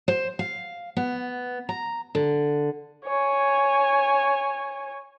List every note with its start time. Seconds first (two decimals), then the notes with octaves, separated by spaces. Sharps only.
0.08 C5
0.39 F5
0.97 B3
1.69 A#5
2.15 D3
3.05 C#5 G#5